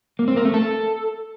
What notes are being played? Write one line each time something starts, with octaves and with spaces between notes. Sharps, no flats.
A#3
C4
A#4
A3
A4